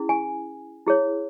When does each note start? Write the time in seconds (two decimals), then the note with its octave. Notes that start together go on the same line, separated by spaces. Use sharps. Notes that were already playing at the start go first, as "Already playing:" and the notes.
Already playing: C#4 E4 G#4
0.09 G#5
0.87 E4 G#4 C#5